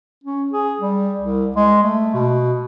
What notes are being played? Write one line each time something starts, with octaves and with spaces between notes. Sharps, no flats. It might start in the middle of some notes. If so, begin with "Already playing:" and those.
C#4
G#4
G3
C2
G#3
A3
B2